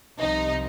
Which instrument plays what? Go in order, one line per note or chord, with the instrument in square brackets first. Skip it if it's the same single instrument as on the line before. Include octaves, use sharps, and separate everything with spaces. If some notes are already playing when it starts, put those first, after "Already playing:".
[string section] C2 C3 F3 D#4